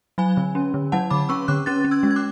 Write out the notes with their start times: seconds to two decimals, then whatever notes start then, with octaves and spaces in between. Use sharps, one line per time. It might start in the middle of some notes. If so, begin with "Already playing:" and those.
0.18 F#3 G#5 B5
0.37 D3
0.55 C#4
0.74 D3
0.92 F#3 F#5 A5
1.10 D3 B5 D6
1.29 C#4 C#6 E6
1.48 D3 D6 F#6
1.66 C#4 F#6 A6
1.85 C#4
1.91 E6 G#6
2.03 G#3
2.11 G#6
2.16 D6 F#6